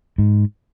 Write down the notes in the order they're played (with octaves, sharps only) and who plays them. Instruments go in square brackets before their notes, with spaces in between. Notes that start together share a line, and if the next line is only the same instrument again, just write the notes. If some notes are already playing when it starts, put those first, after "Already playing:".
[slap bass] G#2